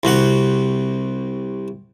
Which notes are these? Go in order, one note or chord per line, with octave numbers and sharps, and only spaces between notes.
C2 C3 F#4 F#5